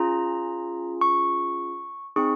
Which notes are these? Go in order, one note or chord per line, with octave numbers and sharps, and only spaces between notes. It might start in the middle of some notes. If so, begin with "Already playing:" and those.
Already playing: C#4 F4 G#4 A#5
C#6
C4 D#4 G#4 C#6